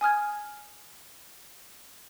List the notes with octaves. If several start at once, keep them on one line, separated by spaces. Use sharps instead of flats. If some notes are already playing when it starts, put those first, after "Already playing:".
G#5 D#6 F6 G#6